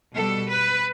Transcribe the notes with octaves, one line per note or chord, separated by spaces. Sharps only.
B2 G3 A4
B4